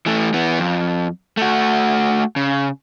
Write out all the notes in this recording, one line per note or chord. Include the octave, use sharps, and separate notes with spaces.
E3 A3
E3 B3
F2
A3 F#4
C#3